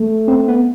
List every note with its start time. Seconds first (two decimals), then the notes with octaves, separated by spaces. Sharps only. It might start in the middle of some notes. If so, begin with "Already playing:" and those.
Already playing: A3
0.28 C4
0.48 B3